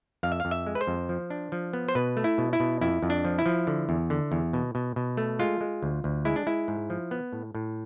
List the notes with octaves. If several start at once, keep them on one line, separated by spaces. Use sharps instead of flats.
F2 F5
E5
F5
F2
E5
G#3
B4
C5
F2
F3
D4
F3
B3
C5
B2 B4
A3
E4
B2
E4
B2
F2 E4
F2
D4
F3
E4
F3
D3
E2
D3
E2
B2
B2
B2
A3
G#3 F4
G#3
D2
D2
G#3 E4
D4
G#3 E4
G#2
F3
B3
A2
A2